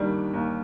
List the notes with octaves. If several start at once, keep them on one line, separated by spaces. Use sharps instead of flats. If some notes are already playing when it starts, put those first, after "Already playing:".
Already playing: D#2 D#3 G3 D4
D#2